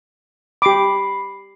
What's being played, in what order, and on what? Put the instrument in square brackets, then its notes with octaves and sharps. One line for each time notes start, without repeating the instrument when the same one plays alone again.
[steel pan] G4 D6 [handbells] B5 C7